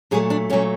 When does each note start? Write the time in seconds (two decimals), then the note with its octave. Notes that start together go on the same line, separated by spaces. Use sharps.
0.11 A#2 F#3 A3 G#4
0.30 D4
0.50 A#2 F#3 A3 C#4